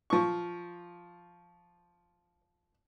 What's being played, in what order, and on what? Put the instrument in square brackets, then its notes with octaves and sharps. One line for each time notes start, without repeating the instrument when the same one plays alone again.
[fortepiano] F3 C#6